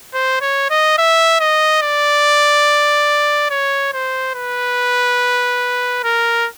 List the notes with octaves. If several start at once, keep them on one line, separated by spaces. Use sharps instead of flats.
C5
C#5
D#5
E5
D#5
D5
C#5
C5
B4
A#4